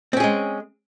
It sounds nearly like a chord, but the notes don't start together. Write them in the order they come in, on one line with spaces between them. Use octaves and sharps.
C4 C#4 G#4 G#3